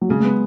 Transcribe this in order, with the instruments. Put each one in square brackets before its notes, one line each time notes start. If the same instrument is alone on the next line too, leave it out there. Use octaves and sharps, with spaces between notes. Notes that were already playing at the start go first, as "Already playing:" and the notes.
[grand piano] F#3
[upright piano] C#3 [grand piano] G#3
[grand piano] G#3 [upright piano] B3